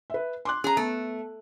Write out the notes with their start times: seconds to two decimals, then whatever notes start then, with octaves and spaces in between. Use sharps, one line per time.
0.10 B4 E5
0.45 C6 D6 F#6
0.64 C#4 G#4 A#5
0.77 A3 B3